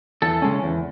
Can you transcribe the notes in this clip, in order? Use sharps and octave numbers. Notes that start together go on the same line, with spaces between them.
E2 A4
C#3 G#3 C#4
E2